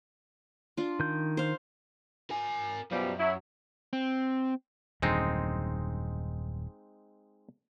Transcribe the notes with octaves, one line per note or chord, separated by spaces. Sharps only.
D4 F4
D#3 G6
C5 F5
A#4 G#5
F#2 B2 F3 G3
F#3 E4
C4
D#1 F#2 D3 G#3 C4 D#4